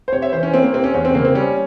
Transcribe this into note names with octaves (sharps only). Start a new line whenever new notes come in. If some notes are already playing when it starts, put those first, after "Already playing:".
C5
C3 C#5
E5
E3 C5
C#4
A#3 C4
A#3
C3 C4
C#4
E2 C#4
C4
C#3 A#3
C4
G3 C#4